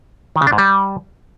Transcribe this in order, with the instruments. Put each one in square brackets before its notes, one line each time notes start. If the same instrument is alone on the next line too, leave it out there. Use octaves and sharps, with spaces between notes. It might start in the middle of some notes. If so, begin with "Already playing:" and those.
[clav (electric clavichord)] D#3
C#3
D4
G#2
G3